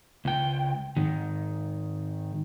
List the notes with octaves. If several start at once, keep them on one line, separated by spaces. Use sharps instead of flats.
C#2 G5
G#2 D#3